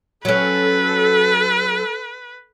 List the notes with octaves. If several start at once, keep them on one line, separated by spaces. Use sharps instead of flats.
F#3 C#4 A4 B4